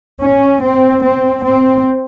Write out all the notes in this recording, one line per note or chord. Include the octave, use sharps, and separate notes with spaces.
C#4
C4
C4
C4